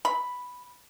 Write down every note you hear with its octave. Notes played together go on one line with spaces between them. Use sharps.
B5